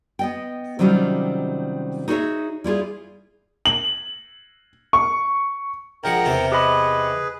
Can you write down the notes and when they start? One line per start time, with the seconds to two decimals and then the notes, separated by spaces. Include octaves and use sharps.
0.19 B3 D#5 G5
0.79 C3 D#3 F#3 G3 C#4 F4
2.08 D#4 F#4 G#4 B4 C#5 E5
2.64 G3 E4 F4 G#4
3.66 F#7
4.93 C#6
6.04 A#1 G#3 A#4 F#5 G5 A#5
6.25 E2 C3 C5
6.52 G4 G#4 B4 D#5 B5